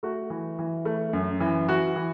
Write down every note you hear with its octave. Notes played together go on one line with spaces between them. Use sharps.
A3 F#4
E3
E3
A3
F#2
E3
E3 F#4
E3